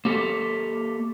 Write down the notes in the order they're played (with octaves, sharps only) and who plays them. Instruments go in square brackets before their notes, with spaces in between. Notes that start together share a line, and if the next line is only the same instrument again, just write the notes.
[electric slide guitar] A#3 G4 A4